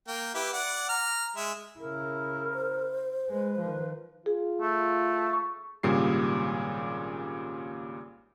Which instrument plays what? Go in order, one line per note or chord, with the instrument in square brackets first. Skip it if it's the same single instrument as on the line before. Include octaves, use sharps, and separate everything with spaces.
[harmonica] A#3 G5
E4 G4 B4
D5 F#5
A#5 F6
G#3 E5
[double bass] C#3 E4 [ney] A#4
[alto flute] C5
[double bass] G#3 [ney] B4
[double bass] D#3 F3
[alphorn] F4 [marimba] G#4
[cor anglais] A3
[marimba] C#6
[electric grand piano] G#1 A#2 C#3 G3 C7